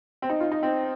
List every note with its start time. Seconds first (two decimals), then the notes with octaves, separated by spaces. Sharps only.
0.22 C4
0.30 D#4
0.40 F4
0.52 D#4
0.63 C4